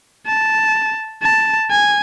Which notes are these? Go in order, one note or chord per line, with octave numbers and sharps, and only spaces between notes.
A5
A5
G#5